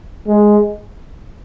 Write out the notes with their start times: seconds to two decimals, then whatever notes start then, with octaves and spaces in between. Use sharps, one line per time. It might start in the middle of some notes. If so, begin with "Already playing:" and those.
0.28 G#3